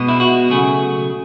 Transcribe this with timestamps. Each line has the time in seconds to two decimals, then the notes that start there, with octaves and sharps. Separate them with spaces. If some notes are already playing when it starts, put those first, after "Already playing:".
Already playing: B2 G#3 B3
0.08 E4
0.20 F#4
0.50 C#3 F#3 A3 G#4